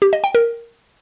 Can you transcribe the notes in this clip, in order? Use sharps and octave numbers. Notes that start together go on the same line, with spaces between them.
G4
D#5
G5
A#4